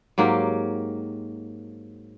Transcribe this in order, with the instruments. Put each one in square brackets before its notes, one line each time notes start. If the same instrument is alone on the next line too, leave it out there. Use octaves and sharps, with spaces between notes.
[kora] G#2 F#3 A#3 G4